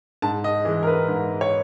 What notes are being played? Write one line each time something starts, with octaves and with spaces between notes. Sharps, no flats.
G#2 A5
D#5
E3 G#3
A#4
B4
G#2
C#5